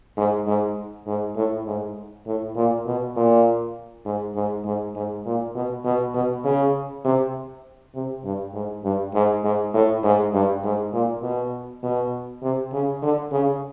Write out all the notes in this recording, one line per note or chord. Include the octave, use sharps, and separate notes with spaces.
G#2
G#2
G#2
A2
G#2
A2
A#2
B2
A#2
G#2
G#2
G#2
G#2
A#2
B2
B2
B2
C#3
C3
C3
G2
G#2
G2
G#2
G#2
A2
G#2
G2
G#2
A#2
B2
B2
C3
C#3
D3
C#3